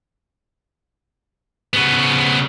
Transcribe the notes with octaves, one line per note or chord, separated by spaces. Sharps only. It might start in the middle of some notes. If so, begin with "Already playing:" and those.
C#3 B3